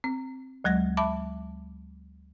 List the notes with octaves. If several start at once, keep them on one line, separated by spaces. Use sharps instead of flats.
C4
D2 F#3 G#3 A#6
E5 A5 B5 D6